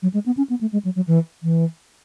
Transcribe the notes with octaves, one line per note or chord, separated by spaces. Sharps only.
F#3
G#3
B3
C#4
B3
A3
G#3
F#3
F#3
E3
E3